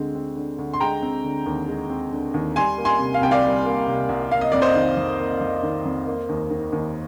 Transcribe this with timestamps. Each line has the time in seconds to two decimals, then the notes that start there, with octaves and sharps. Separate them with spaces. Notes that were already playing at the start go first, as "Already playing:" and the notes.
Already playing: D2 D3 G#3 C4
0.15 C4
0.36 D3
0.58 D2
0.74 C6
0.80 G#3 G5 A#5
1.02 C4
1.24 D3
1.46 D#2
1.68 G#3
1.90 C4
2.12 D3
2.34 D#2
2.56 G3 G#5 C6
2.78 A#3
2.85 G#5 C6
2.99 C3
3.14 F5
3.21 C2 G5
3.31 D5 F5
3.44 G3
3.66 A#3
3.87 C3
4.09 C2
4.31 A#3 F5
4.41 D#5
4.52 F2 D5
4.62 C5 D#5
4.75 D#3
4.97 F2
5.20 A#3
5.41 F2
5.63 D#3
5.85 F2
6.07 A#3
6.29 D#2
6.51 D#3
6.73 D#2